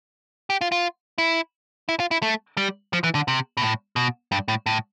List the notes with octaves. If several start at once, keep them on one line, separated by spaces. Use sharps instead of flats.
G4
F4
F4
E4
E4
F4
E4
A3
G3
F3
E3
D3
C3
B2
A2
B2
G2
A2
A2